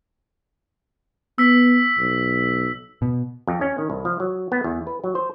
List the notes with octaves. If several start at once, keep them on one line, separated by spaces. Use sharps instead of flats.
B3 E6 B6
B1
B2
F2
C#4
D#3
C2
F3
F#3
B3
E2
B4
F#3
C5